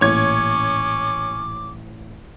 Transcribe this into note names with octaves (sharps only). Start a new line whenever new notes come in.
A1 A#2 C#4 C#5 D6 G#6